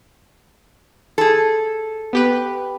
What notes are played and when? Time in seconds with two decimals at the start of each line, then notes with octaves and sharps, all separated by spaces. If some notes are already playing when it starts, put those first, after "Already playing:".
1.18 G#4 A4
2.13 B3 G4 B4